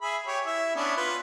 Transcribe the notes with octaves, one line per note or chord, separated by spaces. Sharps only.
G#4 E5 B5
G4 C#5
E4 E5
B3 C#4 D4
F4 B4